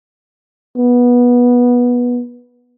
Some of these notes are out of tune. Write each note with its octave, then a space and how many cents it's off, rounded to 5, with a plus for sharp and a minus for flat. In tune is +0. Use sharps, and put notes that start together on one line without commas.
B3 -15